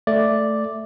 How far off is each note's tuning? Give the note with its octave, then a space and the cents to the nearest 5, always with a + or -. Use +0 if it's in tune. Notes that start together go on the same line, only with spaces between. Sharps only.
A3 +0 D5 +0